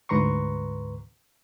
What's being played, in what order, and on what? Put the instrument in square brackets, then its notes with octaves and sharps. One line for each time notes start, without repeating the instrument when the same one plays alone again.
[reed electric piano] D2 G#2 B4 A#5 C6 C#6